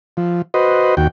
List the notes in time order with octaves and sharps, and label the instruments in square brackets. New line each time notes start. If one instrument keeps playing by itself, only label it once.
[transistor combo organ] F3
F#4 B4 C5 D#5
D#2 F#4 G5